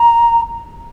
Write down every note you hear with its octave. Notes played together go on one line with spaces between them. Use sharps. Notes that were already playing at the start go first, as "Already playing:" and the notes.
Already playing: A#5